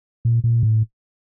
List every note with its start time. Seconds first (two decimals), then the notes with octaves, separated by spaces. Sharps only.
0.25 A#2
0.44 A#2
0.63 A2